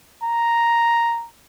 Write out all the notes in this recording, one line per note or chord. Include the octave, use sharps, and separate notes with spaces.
A#5